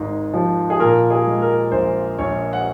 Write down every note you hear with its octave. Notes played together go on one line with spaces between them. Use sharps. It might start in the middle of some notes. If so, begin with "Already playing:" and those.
Already playing: G#1 G#2
F3
G#4
A#2 A#4
G#4
G#3
A#4
A#1 C5
A#1 C#5
F#5